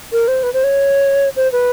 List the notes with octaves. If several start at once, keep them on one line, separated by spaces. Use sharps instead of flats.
A#4
C5
B4
C5
C#5
C5
B4